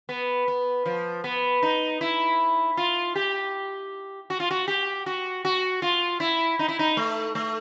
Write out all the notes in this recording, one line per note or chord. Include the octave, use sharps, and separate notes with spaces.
B3
B3
F3
B3
D#4
E4
F4
G4
F#4
F4
F#4
G4
F#4
F#4
F4
E4
D#4
E4
D#4
A3
A3